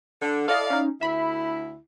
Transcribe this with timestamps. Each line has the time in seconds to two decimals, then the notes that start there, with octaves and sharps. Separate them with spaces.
0.22 D3
0.48 E4 A4 D5 D#5 F5
0.70 C#4 D#4
1.01 D2 E4 E5 B5